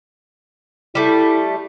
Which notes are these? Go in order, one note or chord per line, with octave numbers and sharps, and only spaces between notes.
G3 A3 E4